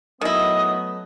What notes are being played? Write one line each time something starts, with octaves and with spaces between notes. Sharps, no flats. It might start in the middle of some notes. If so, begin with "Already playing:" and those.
D#3 F#3 A3 B3 E4 D#5 D#6